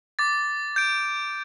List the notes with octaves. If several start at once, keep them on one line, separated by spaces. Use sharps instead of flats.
D6 A6
G6 D7